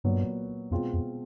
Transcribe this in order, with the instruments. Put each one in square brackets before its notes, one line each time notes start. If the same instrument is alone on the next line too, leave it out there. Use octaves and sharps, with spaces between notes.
[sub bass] G2 [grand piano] A#2 F#3 B3
[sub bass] F2 [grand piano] B2 G#3 C4 F4
[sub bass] F2